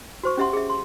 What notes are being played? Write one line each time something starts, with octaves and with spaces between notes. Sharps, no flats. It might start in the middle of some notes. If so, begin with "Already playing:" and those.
F#4 C5 C#6
C#4 G4 E5 F#5 C6
G#4 E5
C6